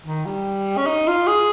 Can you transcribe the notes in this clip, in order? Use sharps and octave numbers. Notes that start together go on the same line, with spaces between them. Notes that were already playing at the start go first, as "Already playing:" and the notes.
D#3
G3
C#4
D#4
F4
G#4